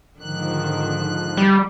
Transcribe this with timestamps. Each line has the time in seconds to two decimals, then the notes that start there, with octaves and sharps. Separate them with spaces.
0.19 G#2 D3 D#3 F3 F#6
1.37 G3